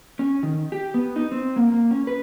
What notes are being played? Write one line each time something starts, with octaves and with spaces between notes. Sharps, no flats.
C#4
D#3
G4
B3
D#4
C4
A#3
A#3
C#4
B4